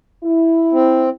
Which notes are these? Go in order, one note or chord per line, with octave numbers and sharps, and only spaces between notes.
E4
C4